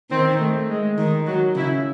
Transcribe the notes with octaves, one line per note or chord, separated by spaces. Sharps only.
D#3 C4
A3
G#3
D#3
D#3 F#3
C#3 E4